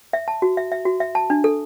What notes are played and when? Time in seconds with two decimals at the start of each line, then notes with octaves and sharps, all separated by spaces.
0.13 E5
0.28 A5
0.42 F#4
0.57 E5
0.72 E5
0.85 F#4
1.00 E5
1.15 A5
1.30 D4
1.44 A4